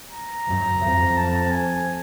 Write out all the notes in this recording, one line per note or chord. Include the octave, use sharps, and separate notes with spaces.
A#5
F#2
F2
A5
G#5